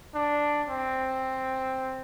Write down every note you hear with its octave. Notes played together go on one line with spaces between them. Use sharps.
D4
C4